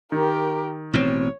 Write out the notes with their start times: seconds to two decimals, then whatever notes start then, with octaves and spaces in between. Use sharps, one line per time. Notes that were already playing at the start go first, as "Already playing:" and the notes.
0.12 D#3 G4 A#4
0.93 A1 B2 C4 C#5